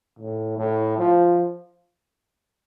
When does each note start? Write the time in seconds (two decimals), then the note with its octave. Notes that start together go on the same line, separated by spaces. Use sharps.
0.19 A2
0.58 A2
0.98 F3